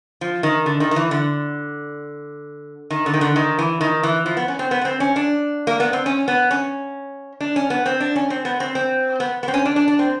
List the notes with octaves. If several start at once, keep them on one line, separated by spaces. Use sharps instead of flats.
F3
D#3
D3
D#3
D#3
E3
D3
D#3
D3
D#3
D3
D#3
E3
D#3
E3
F3
B3
C#4
C4
B3
B3
C4
C#4
D4
A#3
B3
C4
C#4
B3
C#4
D4
C#4
B3
C4
D4
C#4
C4
B3
C4
C4
B3
B3
C4
C#4
D4
D4
D4
C4